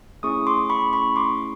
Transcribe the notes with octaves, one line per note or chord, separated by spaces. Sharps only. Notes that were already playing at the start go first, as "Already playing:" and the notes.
A3 C#4 E4 G#4 C#6 D#6
C6 D6
B5 C#6
B5 C#6
C6 D6